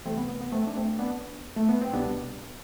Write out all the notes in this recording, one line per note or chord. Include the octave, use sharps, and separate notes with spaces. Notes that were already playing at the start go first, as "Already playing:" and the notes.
C2 C3 E3 A3 C4
B3
B3
B3
A3 C4
D4
A3 C4
B3 D4
A3
B3
C4
C2 B2 G3 B3 D4